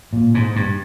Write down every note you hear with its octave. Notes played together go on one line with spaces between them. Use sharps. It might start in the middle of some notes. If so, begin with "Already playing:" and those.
A#2
G#2
G2